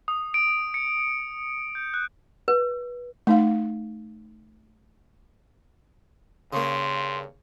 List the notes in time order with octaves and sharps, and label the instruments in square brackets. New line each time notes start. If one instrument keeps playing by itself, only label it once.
[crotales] D#6
D7
C#7
G6
F#6
[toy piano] B4
[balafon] A3 D#4 F5
[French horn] G2 [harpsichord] C#3 A#3 [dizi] C6